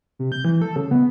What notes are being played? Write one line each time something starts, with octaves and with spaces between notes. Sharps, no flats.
C3
G6
E3
A4
C#3
B3